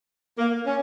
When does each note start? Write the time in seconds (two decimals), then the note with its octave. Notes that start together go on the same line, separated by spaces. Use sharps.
0.38 A#3
0.66 C#4